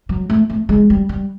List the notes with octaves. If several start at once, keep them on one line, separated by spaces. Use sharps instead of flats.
F#3
A3
A3
G#3
G3
G3